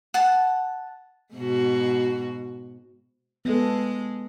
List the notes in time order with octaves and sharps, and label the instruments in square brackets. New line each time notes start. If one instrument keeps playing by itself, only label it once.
[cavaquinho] F#5 A5
[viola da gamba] G#2 B2 F#4
[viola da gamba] G#3 [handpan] B3 A4